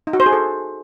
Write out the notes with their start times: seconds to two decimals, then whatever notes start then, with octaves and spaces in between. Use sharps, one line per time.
0.07 D#4
0.13 F#4
0.20 C5
0.26 G#4
0.32 A4